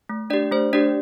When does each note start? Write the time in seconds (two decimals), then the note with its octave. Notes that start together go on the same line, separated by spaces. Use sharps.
0.09 A3
0.30 D4 G4 D5
0.52 A3 C5
0.73 D4 G4 D5